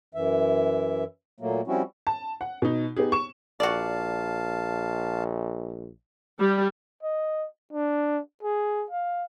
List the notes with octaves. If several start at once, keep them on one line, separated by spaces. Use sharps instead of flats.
F#2 E3 E5
A#2 F#3 A3 A#3
F3 G3 C4 C#4 E4 F#4
A5
F#5
B2 D#4
B3 D#4 G4 G#4
C#6 E7
A#1 F#4 D5 F5 A5
G3
D#5
D4
G#4
F5